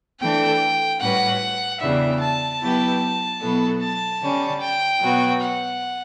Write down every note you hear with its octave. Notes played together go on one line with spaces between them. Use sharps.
E3 A3 D4 A4 G5
A2 G3 C#4 F#4 B4 F#5
E2 C#3 E3 G3 D4 E5
A5
F#3 B3 E4 G4 B4
B2 F#3 B3 E4 A4
A5
D3 G3 C#4
G5
B2 F#3 B3 F#4
F#5